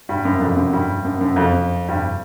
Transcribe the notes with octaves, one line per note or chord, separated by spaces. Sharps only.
G2
F#2
F2
F#2
G2
F#2
F#2
F2
G2